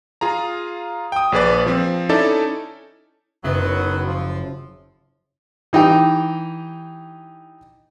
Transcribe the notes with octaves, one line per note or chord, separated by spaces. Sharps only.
F4 G#4 A#5
G5 D#6
A#1 G#4 B4 D5
F3 C4
C#4 D#4 E4 A4 D5 A5
F#1 F#2 D#3 F#3 B3
F3
E3 D#4 G4 G5